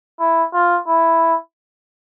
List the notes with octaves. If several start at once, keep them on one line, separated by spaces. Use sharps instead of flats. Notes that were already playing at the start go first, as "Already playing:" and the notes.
E4
F4
E4